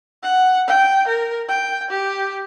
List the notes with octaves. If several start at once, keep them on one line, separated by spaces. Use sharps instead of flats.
F#5
G5
A#4
G5
G4